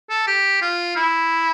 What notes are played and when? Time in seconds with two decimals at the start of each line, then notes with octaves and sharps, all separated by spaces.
0.10 A4
0.27 G4
0.62 F4
0.96 E4